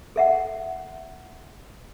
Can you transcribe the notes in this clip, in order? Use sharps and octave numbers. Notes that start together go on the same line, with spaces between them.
A4 E5 F#5